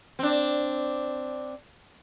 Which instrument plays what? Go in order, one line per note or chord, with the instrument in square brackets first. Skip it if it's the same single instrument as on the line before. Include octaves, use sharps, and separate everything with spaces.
[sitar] C4 D4